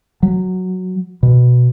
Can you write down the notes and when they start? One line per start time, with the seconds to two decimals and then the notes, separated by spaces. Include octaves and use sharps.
0.23 F#3
1.23 B2